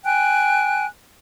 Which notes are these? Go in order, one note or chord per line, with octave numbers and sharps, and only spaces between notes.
G5 G#5 F#6